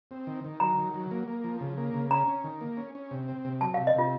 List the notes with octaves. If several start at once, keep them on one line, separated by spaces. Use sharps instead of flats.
C4
D#3
D#3
F#3 A#5
D#3
F#3
A#3
A#3
F3
C#3
A#3
C#3
C#4 A#5
C#4
D#3
A#3
C#4
C#4
C3
C4
C3
F#3 A5
C3 F5
D#5
C3 F4